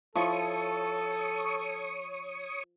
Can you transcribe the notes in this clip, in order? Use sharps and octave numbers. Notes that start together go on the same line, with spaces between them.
F3 E4 A4 C#5 C#6 D#6